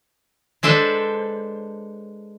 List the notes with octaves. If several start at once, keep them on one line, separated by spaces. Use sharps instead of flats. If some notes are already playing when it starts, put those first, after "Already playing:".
G#3 D4 A4 B4 C5